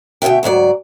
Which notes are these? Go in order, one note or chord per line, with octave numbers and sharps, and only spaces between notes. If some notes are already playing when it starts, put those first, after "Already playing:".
D2 B2 D#3 E5 G5
D2 G#2 F#3 D5